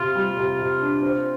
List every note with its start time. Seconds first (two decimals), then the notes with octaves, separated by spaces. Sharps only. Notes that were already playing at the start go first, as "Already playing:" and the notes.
Already playing: C3 F4
0.15 G3
0.36 C3
0.59 C3
0.80 D4
1.02 C4